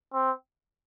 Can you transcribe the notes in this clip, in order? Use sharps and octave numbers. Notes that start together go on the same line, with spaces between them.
C4